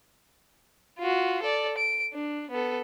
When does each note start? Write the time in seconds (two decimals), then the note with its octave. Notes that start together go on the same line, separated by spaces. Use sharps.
0.99 F4 F#4
1.42 A4 D5
1.78 D7
2.13 D4
2.50 B3 A4